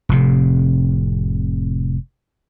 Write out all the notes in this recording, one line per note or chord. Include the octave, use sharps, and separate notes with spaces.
F1 A2 C3